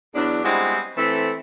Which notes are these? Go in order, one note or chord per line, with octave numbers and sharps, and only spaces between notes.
E2 F#3 D4
G3 G#3 B3 C4 E4 F#4
E3 A3 C4